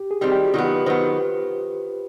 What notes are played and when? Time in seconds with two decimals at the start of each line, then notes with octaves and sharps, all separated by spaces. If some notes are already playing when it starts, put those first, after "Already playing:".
Already playing: G4
0.11 G#4
0.21 D#3 G3 C4 G4
0.32 G4
0.43 F#4
0.54 D#3 F#3 B3 F4
0.65 G4
0.75 B4
0.86 D#3 F#3 B3 C5